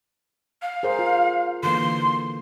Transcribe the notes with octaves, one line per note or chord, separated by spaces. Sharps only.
F5
G#4 A#4 C5
F4
D3 E3 A#3 C6